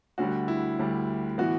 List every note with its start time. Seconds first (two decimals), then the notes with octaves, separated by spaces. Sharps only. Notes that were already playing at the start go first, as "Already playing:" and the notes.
0.18 D2 D3 G3 F#4
0.48 E4
0.79 D2 D3 G3
1.38 A2 E3 B3 F#4